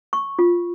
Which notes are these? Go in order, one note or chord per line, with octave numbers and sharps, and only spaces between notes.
C#6
F4